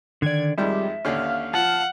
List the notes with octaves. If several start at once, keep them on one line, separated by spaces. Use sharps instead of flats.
D3 D#3 D5 G#6
F2 D#3 G3 G#3 E5
D#2 D3 C#4 F5
F3 F#5 A5